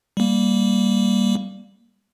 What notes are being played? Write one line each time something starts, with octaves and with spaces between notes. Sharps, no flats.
G3 A#3